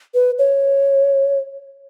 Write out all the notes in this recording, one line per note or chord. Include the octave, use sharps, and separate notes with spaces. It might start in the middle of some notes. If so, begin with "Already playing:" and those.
B4
C#5